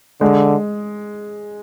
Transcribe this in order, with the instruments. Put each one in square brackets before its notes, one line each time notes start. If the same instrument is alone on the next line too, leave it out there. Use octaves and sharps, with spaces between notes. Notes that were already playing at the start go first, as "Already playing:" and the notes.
[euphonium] D3 [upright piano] G#3